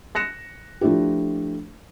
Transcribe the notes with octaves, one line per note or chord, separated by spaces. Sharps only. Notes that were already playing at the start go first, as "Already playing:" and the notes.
F#6 A#6 C#7 E7
F3 A3 D4 E4 G4